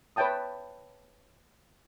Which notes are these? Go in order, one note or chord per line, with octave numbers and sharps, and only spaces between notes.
B4 C#5 E5 G5 A5 D#6